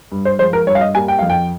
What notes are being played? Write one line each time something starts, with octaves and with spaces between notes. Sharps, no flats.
G2
C5
F3 G#3 C5
A#4
G2 C#5
F5
D#5
G3 A#3 G#5
G5
F2 F5
G5